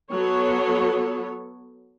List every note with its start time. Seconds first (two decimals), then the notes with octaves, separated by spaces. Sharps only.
0.12 F#3 B3 A4 C#5